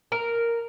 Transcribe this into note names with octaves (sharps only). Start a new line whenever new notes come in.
A#4